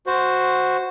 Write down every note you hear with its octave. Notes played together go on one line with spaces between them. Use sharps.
F#4 C5